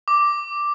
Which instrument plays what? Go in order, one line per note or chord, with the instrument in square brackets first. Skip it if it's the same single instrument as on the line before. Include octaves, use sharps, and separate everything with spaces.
[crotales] D6